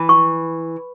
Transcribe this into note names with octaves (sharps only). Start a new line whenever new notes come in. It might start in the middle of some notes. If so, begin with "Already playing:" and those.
Already playing: E3
C#6